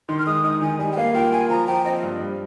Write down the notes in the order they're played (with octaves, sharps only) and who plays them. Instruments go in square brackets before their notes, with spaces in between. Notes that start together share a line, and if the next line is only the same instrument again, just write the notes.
[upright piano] D#3 [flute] C6
[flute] F6
[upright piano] G#3 [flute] D#6
[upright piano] D#4 [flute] D#6
[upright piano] D#3 [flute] G#5
[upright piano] G3 [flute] G#5
[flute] G5
[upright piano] A#3 [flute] F5
[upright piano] F4 [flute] G5
[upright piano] F4 [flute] G#5
[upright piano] F3 [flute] A#5
[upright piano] F3 [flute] G5
[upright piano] C4 [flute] D#5
[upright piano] G2
G3